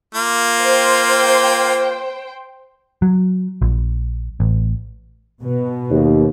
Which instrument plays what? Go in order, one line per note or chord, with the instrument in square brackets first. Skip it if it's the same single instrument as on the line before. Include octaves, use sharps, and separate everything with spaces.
[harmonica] A#3 F4
[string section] C5 G5
[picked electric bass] F#3
A#1
A1
[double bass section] B2
[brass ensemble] D#2